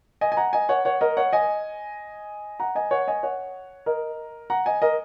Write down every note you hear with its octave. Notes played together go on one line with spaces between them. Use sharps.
D#5 G#5
G#5
F#5 A#5
D#5 G#5
C#5 F#5
C#5 F#5
A#4 D#5
C#5 F#5
D#5 G#5
F#5 A#5
D#5 G#5
C#5 F#5
D#5 G#5
C#5 F#5
A#4 D#5
F#5 A#5
D#5 G#5
A#4 D#5